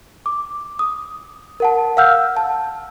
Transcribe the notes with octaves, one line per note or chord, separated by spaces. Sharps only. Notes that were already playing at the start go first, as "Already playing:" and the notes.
D6
D#6
A#4 F#5 A5
F5 F#5 E6 F6 G6
A5